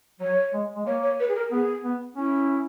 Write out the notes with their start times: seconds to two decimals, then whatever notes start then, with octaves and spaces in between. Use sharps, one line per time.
0.20 F#3 C#5
0.53 G#3
0.76 G#3
0.86 A#3 C#5
1.02 C#5
1.19 B4
1.28 G#4
1.35 A#4
1.51 B3 G#4
1.84 B3
2.16 C#4 E4